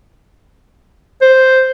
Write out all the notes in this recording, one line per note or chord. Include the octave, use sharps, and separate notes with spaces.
C5